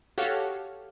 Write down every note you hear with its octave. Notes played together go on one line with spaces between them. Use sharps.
F#4 G4 A4 C#5 F5